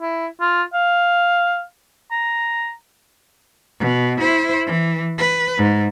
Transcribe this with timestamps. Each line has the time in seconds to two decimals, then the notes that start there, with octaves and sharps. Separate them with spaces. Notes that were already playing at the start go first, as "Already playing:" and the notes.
0.01 E4
0.41 F4
0.74 F5
2.11 A#5
3.79 B2
4.20 E4 C5
4.67 E3
5.18 B4
5.58 G#2